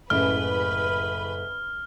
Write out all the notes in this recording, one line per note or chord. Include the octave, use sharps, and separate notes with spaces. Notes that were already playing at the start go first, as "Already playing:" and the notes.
F#1 A2 C#3 B4 F6